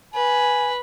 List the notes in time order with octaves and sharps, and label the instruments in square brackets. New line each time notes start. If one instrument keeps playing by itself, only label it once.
[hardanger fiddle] B4 [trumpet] G#5